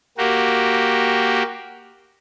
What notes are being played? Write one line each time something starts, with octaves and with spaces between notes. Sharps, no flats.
A#3 F#4 G4